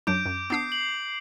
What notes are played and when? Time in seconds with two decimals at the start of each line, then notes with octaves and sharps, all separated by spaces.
0.07 F#2 F#3 D4 D6 G6 D7
0.26 F#2
0.50 B3 D4 D6 D#6 C7
0.72 F#7